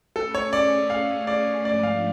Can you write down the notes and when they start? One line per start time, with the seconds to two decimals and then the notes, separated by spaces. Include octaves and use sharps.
0.15 A3 C#4 G#4 A4
0.35 C#5
0.53 D5
0.90 F5
1.27 D5
1.65 G#2 F3 A3 D4 D5
1.83 F5